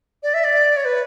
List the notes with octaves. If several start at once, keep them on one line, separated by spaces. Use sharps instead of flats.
D5
E5
D5
C#5
B4